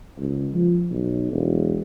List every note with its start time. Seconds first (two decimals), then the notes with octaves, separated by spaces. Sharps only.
0.19 C#2
0.54 F3
0.91 B1
1.32 E1